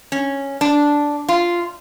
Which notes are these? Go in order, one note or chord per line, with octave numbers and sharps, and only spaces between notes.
C#4
D4
F4